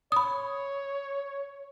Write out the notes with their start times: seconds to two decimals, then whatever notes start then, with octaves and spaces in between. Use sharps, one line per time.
0.12 C#5 B5 D#6